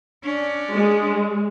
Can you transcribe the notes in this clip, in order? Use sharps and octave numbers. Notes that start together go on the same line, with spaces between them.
C#4 D4 D5
G#3